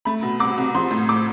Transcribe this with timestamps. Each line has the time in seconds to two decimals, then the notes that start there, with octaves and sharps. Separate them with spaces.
0.05 A3 B5
0.22 B2
0.39 C2 D6
0.58 C2
0.75 F3 C6
0.91 A2
1.09 A2 D6